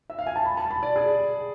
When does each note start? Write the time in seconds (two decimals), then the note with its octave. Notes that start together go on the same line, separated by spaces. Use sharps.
0.10 E5
0.19 F5
0.27 G#5
0.36 A5
0.45 B5
0.57 A5
0.71 B5
0.83 D5
0.96 G#4